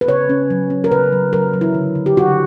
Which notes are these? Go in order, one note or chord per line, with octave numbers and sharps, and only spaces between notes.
B4
C#3 C#5
C#4
F#3
C#4
A#4
C#3 B4
F#3
F#3 A#4
F#3
E4
D3
D3
G4
D3 F#4